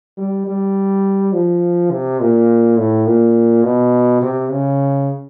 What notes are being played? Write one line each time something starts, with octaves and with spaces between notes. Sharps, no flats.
G3
G3
F3
C3
A#2
A2
A#2
B2
C3
C#3